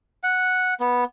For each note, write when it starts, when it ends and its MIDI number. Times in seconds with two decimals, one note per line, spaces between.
0.24 0.74 78
0.80 1.04 59